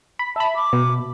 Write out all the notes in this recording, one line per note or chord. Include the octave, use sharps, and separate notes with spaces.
B5
E5 A5 B5
D6
B2